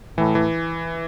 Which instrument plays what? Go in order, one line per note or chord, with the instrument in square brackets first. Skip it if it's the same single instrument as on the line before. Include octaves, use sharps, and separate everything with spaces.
[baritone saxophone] A2 [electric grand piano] E3
[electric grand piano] E3